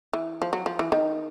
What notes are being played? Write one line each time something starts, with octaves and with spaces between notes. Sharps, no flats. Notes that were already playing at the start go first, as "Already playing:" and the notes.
E3
F3
F#3
F3
E3
D#3